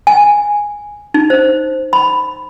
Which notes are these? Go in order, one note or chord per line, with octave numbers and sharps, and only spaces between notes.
G#5
D#4
C5
B5